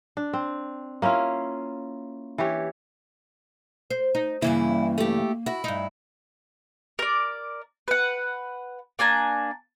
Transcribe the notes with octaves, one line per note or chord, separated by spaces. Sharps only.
D4
C4
A#3 C#4 E4 F4
E3 E4 G4 C#5
C5
D#4
G2 C#3 E3 A#3 E4
A3 G4
E4 F#4
G2 D#4
A#4 D5
B4 F#5
A#3 D4 G#5 A#5